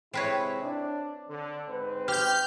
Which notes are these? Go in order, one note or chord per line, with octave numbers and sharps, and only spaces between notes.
C3 G#3 C4 E4 B4 C#5
D4
D3
G#2 C4 B4
G4 F6 G6